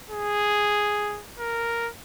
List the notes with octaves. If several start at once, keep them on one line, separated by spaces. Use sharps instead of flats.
G#4
A#4